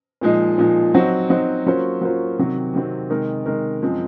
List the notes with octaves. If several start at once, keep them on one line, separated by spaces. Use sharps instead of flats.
A#2 F3 G#3 D#4
A#2 F3 G#3 D#4
F#3 C4 D#4 F#4 C5
F#3 C4 D#4 F#4 C5
F#3 A#3 C#4 F4 C5
F#3 A#3 C#4 F4 C5
C3 D#3 F#3 C4
C3 D#3 F#3 C4
C3 D#3 G#3 D#4 A#4
C3 D#3 G#3 D#4 A#4
F#2 F3 G#3 C4